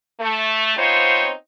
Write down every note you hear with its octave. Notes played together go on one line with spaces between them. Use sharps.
A3
B3 C4 D#4 F4 C5 C#5